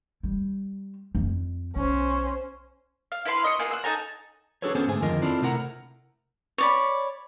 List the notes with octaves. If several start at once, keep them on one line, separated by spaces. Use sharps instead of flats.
G3
F2
B1 C#4 C5
F5
E4 B4 F5 C6
D#5 C#6
A#3 B3 F4 G#4
F#5 E6
D#4 A4 G#5 A#5
D4 F#4 G#4 A4 B4 C#5
B3 C#4 G#4 A4 C5 C#5
G#2 D3 A3 G#4 G#5
F2 D3 D#3 F4 A#4 D#5
C4 D4 E4 F4 A4
C3 A3 E4 A#4 F#5 A#5
C#5 D5 B5